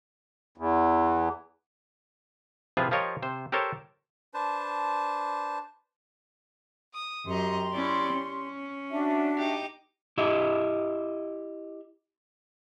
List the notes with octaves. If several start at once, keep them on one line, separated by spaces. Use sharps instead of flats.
E2
C3 F3 E4 F4 G#4 B4
F3 F4 G4 A#4 C#5 D#5
C3 C5
G4 A4 A#4 C5 C#5 A5
D4 B4 C5 A5
D#6
F#2 G4 D#5 A#5 C6
C#4 E4 D5
C#4
D4 F#4 E5
D#4 G4
E4 G4 D#5 E5